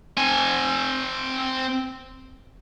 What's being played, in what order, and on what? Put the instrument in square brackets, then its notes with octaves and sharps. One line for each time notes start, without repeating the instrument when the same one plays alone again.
[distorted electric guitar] C4 G#5